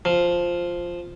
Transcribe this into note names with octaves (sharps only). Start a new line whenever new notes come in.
F3